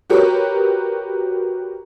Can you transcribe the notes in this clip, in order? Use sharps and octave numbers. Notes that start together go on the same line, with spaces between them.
F#4 G4 A#4 B4 C#5